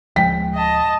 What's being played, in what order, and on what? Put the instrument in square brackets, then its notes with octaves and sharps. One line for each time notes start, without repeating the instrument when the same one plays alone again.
[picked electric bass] D1 F3 G#3 [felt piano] G5 B6
[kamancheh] D#5 A5